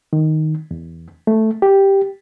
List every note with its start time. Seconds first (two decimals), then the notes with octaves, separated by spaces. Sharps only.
0.13 D#3
0.71 E2
1.27 A3
1.62 G4